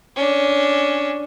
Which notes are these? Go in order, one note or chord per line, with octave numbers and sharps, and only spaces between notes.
C#4 D4